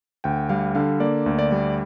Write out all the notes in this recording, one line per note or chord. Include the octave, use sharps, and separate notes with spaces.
D2 G5
G3 F5
D3 F5
A#3 D5
D2
D5
G3